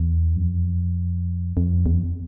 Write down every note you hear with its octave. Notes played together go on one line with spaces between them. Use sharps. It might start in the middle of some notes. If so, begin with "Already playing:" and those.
Already playing: E2
F#2
F2
F2
E2
F2